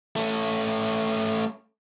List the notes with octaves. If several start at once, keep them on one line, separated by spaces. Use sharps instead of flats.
A3 C#4